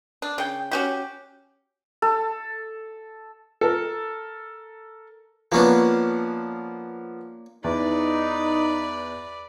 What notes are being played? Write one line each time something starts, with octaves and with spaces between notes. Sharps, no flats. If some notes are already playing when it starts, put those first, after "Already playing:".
D4
C#3 G5
C#4 F#4 G4
A4
A4 A#4
F3 A#3 B3 C#4 D4
E2 D#4 B4 D5